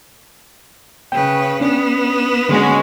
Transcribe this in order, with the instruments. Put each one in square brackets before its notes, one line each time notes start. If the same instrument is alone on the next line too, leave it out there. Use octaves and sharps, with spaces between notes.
[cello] C#3 B4 [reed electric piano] G5
[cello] B3 B4 [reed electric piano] C#4 D4
[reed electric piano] D3 [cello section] G#3 C#4 F#4